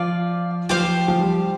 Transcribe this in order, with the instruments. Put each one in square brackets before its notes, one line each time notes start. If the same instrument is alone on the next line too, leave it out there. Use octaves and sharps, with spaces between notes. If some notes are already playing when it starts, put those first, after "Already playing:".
Already playing: [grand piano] F3 [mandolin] F4 D5 F5
[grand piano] F3 [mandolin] G4 C5 F5
[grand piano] F3
G3